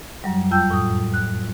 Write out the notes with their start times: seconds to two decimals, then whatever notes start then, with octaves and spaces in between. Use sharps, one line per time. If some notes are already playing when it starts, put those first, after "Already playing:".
0.24 F#2 F#3 G3
0.51 F2 F4 G5 E6 G6
0.71 A2 D#6
1.14 F#6